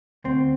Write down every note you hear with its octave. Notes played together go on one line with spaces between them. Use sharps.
D2 C4